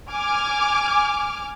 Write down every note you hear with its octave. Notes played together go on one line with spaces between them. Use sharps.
G#5 D6 F6